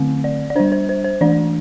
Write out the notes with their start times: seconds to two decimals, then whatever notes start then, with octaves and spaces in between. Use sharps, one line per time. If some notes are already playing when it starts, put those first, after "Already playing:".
Already playing: D3 A3 C4
0.24 D5
0.50 D5
0.56 G3 D4 C5
0.72 C5
0.89 C5
1.04 C5
1.21 E3 A3 D4 D5